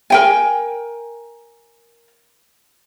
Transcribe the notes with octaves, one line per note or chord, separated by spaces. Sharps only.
A#4 G5 G#5